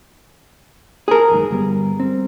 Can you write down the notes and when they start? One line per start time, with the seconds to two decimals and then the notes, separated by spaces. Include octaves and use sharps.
1.08 G#4 A#4
1.30 F#1 D#2 G#2
1.51 G1 G3 B3
2.00 G3 C4